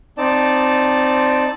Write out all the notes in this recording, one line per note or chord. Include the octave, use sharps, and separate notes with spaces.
C4 D#4 D5 A5